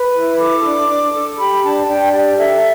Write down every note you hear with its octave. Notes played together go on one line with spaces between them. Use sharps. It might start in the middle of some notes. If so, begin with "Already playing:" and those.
Already playing: B4
E4
A4 D6
D4
D4
A4
G4 B5
D4 A5
D4 G5
G4 D5
A4 E5